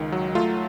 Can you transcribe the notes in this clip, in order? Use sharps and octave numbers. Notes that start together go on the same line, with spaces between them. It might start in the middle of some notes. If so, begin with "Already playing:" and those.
Already playing: C#2 D#3
F#3
A3 F4